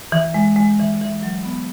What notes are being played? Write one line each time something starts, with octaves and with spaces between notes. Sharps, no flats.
E3
G#3
G#3
E3
E3
F#3
B3